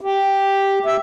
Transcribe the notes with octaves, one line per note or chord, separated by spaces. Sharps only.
G4
E5